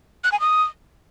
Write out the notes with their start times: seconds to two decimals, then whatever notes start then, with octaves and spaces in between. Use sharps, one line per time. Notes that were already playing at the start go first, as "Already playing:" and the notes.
0.24 F#6
0.32 G#5
0.40 D#6